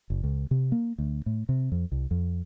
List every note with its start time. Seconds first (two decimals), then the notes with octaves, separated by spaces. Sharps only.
0.10 F#1
0.24 C#2
0.51 C3
0.72 A#3
0.98 D2
1.26 A2
1.49 C3
1.72 F2
1.92 C2
2.11 F2